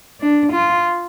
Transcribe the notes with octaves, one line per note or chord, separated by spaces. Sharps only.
D4
F4